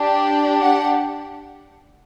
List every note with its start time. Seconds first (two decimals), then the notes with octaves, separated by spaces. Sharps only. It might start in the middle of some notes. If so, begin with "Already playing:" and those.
Already playing: D4 G4
0.61 F#5